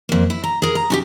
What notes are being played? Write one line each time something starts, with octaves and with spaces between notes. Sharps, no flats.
F2 A#3
E4
A#5
G#4 A#4
A#5
C#4 F#4 G4